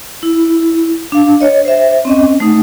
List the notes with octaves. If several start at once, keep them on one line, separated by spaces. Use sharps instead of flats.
E4
D4 F5
C#5 D#5
C5 E5
C4 C#4 D#5
A3 D#4